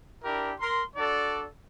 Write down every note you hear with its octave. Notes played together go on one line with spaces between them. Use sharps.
D4 E4 G4 A#4
A#4 C6
D4 F#4 A4 D5